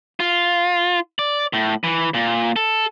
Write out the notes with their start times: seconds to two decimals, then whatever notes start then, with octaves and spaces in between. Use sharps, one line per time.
0.20 F4
1.19 D5
1.53 A2
1.84 E3
2.14 A#2
2.56 A4